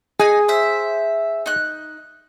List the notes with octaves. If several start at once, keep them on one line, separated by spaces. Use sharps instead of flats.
D#4 G#4 G#5
C5 E5
D#4 F#6